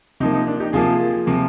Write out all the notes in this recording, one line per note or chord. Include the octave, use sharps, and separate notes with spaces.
C3 F3 A#3 D#4
D#4
D4
D#4 G4
C3 F3 A#3 F4 G#4
C3 F3 A#3